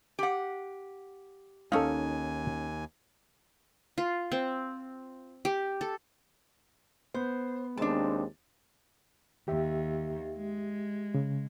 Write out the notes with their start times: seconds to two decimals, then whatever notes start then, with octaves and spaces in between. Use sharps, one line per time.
0.19 G4 F#5
1.72 D#2 C#4 D#4 A4 F5 G#5
3.98 F4
4.32 C4
5.45 G4
5.81 A4
7.14 B3 C5
7.77 D#2 G#3 C4 D4 A5
9.48 D#2 G4 E5
10.36 G#3
11.14 C#3